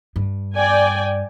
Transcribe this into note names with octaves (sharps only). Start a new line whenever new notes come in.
G2
D5 G5 G#5